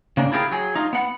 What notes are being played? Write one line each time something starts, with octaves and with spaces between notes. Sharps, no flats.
C#3 A#3 D4
E4 F4 G4 G#4 A#4
F#3 G#4
D#4 F4
B3 F#5